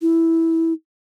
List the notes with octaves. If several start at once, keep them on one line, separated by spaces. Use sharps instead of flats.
E4